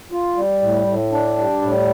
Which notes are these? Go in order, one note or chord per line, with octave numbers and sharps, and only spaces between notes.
F4
G3
A2
A2
D4
G3
A2